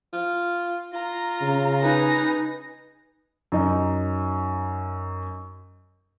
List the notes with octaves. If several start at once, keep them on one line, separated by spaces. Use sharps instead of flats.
F4
F4 A#5
C#3
D#4 B4 G#5 A#6
F#2 D#4